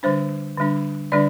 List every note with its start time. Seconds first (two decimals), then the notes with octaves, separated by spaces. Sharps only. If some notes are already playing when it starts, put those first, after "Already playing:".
0.03 D3 G3 D4 C5
0.57 D3 G3 D4
1.12 D3 G3 D4 D5